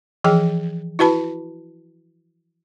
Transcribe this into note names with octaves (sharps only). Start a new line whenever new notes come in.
E3 F3 G#4 G5
E4 F#4 B4 A5 B5